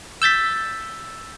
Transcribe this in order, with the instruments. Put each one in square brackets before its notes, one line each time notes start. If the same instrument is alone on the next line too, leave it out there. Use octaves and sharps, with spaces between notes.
[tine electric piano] E6 G6 A6 B6